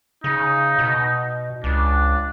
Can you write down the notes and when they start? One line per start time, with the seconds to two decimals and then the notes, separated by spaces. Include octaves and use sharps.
0.24 C#3 D#4
0.79 B2
1.64 C#2 D4